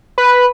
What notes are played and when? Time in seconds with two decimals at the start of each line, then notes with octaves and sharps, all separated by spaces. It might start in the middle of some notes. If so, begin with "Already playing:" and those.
0.18 B4